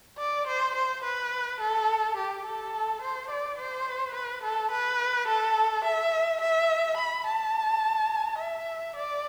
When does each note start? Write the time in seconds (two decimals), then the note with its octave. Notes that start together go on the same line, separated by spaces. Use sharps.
0.18 D5
0.47 C5
0.75 C5
1.04 B4
1.60 A4
2.16 G4
2.45 A4
3.02 C5
3.30 D5
3.58 C5
4.15 B4
4.43 A4
4.71 B4
5.28 A4
5.85 E5
6.41 E5
6.97 B5
7.26 A5
8.39 E5
8.96 D5